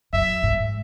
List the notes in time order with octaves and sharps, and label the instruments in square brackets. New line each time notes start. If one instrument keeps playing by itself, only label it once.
[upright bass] F#2 [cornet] E5
[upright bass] G#2